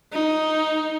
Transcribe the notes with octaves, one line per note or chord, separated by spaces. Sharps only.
D#4